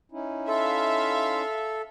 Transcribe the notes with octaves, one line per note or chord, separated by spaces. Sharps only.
C#4 D#4 E4
A4 E5 F5 C6